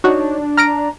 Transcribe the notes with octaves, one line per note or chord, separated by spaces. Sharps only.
D4 D#4 F#4 C#5
A#5 F6 A#6 D7